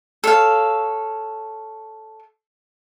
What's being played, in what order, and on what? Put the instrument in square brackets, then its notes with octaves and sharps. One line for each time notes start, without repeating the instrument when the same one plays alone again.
[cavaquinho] A4 C#5 F5